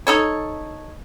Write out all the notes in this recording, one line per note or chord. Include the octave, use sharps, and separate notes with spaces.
D#4 A4 C#5